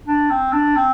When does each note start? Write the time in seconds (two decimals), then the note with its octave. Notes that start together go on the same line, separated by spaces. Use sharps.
0.07 D4
0.30 C4
0.53 D4
0.76 C4